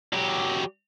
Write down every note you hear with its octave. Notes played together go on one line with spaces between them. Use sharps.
F#3 G4